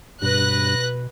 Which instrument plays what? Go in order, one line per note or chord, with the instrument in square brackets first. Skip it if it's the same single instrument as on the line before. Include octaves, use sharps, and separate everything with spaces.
[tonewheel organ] G2 [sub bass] B2 [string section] B4 F#6 A#6